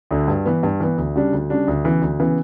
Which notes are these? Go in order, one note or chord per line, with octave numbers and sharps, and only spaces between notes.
D2 D3
G2
E3 B3
G2
E3 B3
D2
C#3 G3 D4
D2
C#3 G3 D4
D2
C#3 E3 B3
D2
C#3 E3 B3